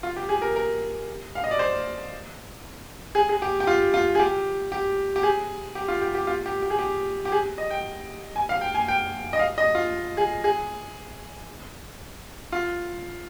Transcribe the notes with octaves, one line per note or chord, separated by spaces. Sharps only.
F4
G4
G#4
A#4
A#4
F5
D#5
D5
C5
G#4
G#4
G4
G4
F4
F4
G#4
G4
G4
G4
G#4
G4
F4
G4
G4
F4
G4
G4
G#4
G4
G4
G#4
D#5
G5
G#5
F5
G5
G#5
G5
D#5
F5
D#5
F4
G#4
G#4
F4